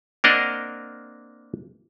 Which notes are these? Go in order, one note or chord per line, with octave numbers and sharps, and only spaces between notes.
A#3 C4 D4 A#4 D#5 F#5